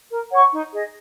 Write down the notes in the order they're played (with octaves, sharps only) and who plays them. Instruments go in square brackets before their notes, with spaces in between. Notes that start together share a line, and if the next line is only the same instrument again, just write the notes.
[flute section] A#4
C#5 F#5 C#6
D#4
G#4 D#5